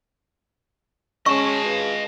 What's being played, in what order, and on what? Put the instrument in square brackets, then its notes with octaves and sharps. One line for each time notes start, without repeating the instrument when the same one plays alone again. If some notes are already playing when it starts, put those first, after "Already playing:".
[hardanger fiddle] G#3 [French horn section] C#4 [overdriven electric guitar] D#5 A5 [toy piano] C#6
[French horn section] F4 G#4 B4